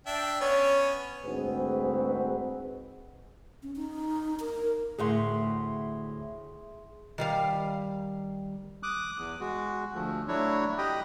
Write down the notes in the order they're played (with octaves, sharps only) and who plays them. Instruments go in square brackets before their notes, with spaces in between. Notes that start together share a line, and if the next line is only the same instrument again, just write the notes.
[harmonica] D4 E5 G5
[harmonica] B3 C#4 [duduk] C#5
[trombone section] D2 G#2 C4 F#4 G#4 B4
[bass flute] C#4
D#4
A#4
[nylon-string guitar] D2 A2 F#5 [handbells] G#4 E5 C6
[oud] D#3 G3 F5
[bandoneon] D6 D#6 F#6
E2
G#3 F#4
D2 F3 A3
F#3 A3 D4 E4 F#4 C#5
G4 D#5 G5 B5 D#6